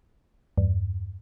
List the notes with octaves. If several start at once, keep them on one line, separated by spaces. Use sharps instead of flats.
E2 G2